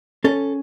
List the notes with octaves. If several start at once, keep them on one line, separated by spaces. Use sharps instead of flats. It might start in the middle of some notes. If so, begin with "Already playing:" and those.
C#4 A4